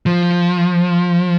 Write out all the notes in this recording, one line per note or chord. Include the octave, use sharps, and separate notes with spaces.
F3